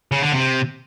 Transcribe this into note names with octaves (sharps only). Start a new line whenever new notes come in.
C#3
D3
C3